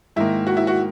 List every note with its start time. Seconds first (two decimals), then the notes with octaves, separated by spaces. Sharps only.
0.16 G#2 D#3 A#3 E4
0.47 F#4
0.57 E4
0.67 F#4